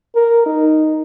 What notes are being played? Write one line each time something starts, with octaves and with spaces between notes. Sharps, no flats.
A#4
D#4